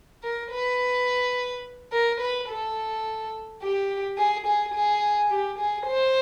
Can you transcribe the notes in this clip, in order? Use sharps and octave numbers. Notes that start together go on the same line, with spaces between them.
A#4
B4
A#4
B4
A4
G4
G#4
G#4
G#4
G4
G#4
C5